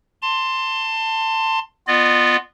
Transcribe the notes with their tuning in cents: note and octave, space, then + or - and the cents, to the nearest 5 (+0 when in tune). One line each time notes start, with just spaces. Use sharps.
A5 +25 C6 +0
B3 +0 F4 +0 D#5 -45